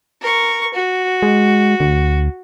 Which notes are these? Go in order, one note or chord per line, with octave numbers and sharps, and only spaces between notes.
A#4 C#6
F#4
G#3
D2